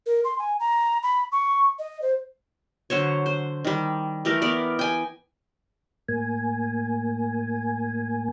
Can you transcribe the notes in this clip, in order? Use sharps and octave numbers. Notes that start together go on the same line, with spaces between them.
A#4
C6
G#5
A#5
B5
C#6
D#5
C5
D3 F#3 C5 C#5
C5
D#3 G3
E3 A3 G4 A#4
B3 A#4 D5
G5 G#5
A2 A#3 G#5